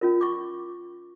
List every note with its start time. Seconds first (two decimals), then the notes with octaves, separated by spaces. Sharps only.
0.01 C#4 F4 A#4
0.21 C#6 D6